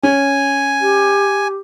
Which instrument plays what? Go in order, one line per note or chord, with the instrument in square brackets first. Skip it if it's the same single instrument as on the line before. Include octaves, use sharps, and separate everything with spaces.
[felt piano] C#4 [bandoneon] G#5
[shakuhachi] G4